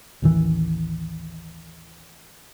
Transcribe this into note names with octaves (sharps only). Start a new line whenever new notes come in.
A1 D#2 E3